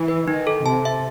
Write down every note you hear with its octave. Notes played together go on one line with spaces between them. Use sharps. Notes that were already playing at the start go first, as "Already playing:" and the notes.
Already playing: E3
B4
D#3 D#4
A4
C3 A5
E5